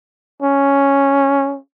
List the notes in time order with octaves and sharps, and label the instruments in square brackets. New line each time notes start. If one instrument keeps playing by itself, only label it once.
[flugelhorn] C#4